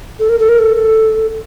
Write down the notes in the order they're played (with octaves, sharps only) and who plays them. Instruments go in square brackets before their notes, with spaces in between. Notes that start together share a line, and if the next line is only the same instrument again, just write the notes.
[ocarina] A4
A#4
A4
A#4
A4
A4